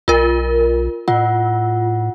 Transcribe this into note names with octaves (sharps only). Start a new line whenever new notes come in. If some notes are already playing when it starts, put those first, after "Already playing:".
B1 F4 A#4
A2 F4 F#5